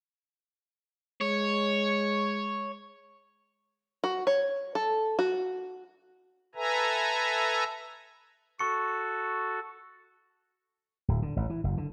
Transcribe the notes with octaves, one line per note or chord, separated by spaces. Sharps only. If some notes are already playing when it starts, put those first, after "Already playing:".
G#3 C#5
F#4
C#5
A4
F#4
A4 B4 E5 G#5 A#5
F#4 A4 C#6 C#7
D1
D3
A1
E3
F#1
D3